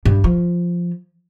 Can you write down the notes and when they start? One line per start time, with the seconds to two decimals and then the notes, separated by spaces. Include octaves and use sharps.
0.05 G2
0.24 F3